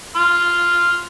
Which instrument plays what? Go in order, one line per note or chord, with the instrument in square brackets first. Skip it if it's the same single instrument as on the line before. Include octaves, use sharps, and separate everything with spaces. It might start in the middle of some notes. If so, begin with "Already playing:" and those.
[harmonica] C6 F6